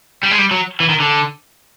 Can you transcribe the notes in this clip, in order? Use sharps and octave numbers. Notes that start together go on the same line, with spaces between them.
G3
G#3
G3
F#3
E3
D#3
D3